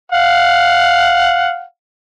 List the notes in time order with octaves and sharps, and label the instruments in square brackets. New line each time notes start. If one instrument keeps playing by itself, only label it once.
[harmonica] F5 F#5